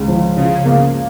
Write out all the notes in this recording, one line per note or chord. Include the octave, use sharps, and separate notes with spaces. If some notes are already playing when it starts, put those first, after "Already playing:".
Already playing: C#2
F3
C#3 F4
A#3